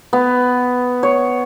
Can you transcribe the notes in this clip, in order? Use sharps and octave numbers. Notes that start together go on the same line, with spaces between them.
B3
C#5